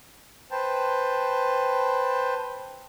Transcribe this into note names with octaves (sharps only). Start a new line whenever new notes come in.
B4 C5 G5 A5